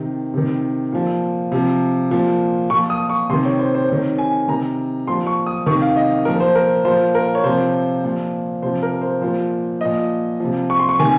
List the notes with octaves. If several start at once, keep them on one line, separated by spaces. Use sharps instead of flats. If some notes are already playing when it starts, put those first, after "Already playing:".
Already playing: C3 D#3
C3 D#3
A#2 F3
C3 F3
A#2 F3
A#2 F3 C#6
D#6
C#6
C3 D#3 C6
C#5
C5
C5
C3 D#3 C#5
G#5
C3 D#3 A#5
A#2 F3 C6
C#6
D#6
C3 D#3 C#6
F5
D#5
A#2 F3 A#4
C5
A#4
A#2 F3 C5
A#4
C#5
C3 F3 C5
A#2 F3
C3 F3 C5
A#4
C5
A#2 F3 C5
A#2 F3 D#5
C3 F3
C#6
C6
C#6
C3 D#3 G#5